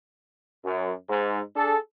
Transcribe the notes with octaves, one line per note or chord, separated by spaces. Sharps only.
F#2
G#2
D4 G#4 A4